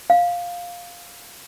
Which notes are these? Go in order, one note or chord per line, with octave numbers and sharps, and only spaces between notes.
F5